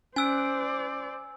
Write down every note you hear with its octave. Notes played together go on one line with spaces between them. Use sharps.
C#4 C5 D5 G#5 E6 F#6 D7